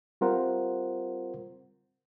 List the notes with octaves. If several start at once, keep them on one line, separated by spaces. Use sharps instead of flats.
G3 C4 F4 A#4 C5 F#5